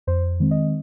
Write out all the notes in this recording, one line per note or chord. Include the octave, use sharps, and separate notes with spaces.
F2 C5
D#3 G#3 C4
D#5